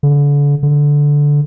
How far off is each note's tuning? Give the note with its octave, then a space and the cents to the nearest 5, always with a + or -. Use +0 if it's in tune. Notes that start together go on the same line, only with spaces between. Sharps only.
D3 -35
D3 -10